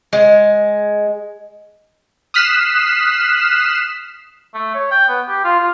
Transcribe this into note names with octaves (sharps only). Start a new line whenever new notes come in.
G#3
D#6 F6 F#6 B6 C7 E7
A3
C#5
G5
B3
G4
F4
F4